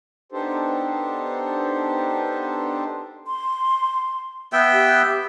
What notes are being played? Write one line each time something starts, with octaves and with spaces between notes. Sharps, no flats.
B3 D4 D#4 G4 A4 C5
C6
B3 E5 G5
G4